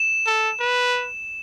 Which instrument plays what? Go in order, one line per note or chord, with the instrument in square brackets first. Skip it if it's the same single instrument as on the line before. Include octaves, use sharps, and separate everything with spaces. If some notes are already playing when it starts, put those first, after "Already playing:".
Already playing: [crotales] E7
[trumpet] A4
B4